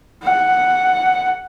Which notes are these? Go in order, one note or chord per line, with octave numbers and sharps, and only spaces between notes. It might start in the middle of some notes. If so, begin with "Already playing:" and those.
F#5